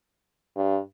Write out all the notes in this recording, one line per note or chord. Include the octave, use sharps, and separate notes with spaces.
G2